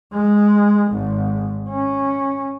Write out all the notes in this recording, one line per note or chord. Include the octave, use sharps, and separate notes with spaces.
G#3
G#1
C#4